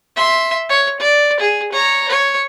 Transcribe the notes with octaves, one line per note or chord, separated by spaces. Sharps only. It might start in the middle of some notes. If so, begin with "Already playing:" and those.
E5 C6
C#5
D5
G#4
C#5 A#5
C#5